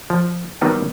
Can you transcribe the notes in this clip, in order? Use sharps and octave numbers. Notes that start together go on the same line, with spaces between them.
F3
D#3 F#3 G3 B3 D4 D#4